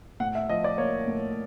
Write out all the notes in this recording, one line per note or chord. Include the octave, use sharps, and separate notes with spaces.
A2 F#5
E5
F3 D#5
D5
A#3 C#5
A2